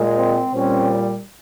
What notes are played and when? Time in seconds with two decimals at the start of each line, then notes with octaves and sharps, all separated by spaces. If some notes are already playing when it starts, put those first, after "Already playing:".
Already playing: A#2 G#3
0.16 C4
0.54 A#2 G3 C4 C#4